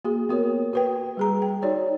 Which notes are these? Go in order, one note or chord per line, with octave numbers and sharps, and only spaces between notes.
A#3 F#4 G#4
B3 F#4 A#4 C#5
F#4 B4 G5
G3 G#4 A#5
G5
D#4 F#4 C#5 D5